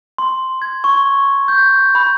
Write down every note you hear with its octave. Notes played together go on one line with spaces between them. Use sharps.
C6
G#6
C#6
G6
B5